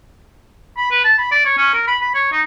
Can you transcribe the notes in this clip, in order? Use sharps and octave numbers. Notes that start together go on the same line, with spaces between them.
B5
B4
A5
B5
D5
C#5
C#4
A#4
B5
B5
C#5
D#4